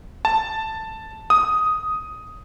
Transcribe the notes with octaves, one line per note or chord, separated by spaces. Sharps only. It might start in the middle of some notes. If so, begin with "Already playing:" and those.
A5
D#6